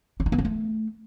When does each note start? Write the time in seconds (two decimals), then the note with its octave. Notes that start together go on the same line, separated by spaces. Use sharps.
0.20 C#4
0.26 D#4
0.32 B3
0.38 C#4
0.45 A3